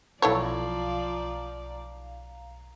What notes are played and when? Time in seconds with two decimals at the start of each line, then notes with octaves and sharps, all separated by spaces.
0.22 B1 F3 E4 A4 C#5 D5 F5 A#5